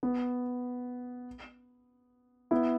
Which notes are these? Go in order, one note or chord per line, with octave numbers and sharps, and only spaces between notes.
B3
B3 E4